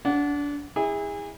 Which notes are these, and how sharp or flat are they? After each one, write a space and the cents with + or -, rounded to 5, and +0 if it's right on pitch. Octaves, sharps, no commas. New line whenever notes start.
D4 -25 F#5 +0
E4 -25 G#4 -30